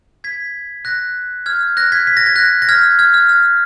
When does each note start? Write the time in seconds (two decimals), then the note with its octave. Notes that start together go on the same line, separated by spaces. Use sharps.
0.24 G#6 B6
0.85 F#6 A#6
1.46 F6 G#6
1.77 F#6 A#6
1.92 G#6 B6
2.07 B6
2.17 A#6
2.26 G#6
2.36 F#6 A#6
2.62 A#6
2.69 F6 G#6
2.99 F6 G#6
3.14 F6
3.29 F6